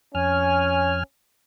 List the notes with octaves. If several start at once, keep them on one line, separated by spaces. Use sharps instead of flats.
F2 C#4 G#5 F6